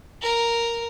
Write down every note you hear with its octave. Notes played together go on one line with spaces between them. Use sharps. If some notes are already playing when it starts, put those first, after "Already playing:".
A#4